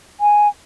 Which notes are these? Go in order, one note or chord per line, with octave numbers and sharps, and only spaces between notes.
G#5